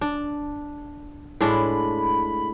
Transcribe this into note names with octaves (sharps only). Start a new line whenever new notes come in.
D4
A2 G#3 D4 B5